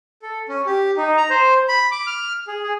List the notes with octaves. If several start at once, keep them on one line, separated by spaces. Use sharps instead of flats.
A4
C#4
G4
D#4
A#5
C5
B5
D6
F6
G#4
G#4